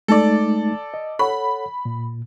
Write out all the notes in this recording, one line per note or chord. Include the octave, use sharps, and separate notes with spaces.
G#3 A3 D#4 A4 D5
D#5
A4 C#5 F#5 B5
A#2